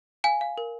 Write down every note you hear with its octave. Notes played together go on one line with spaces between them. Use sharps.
F5 G#5
F5
A#4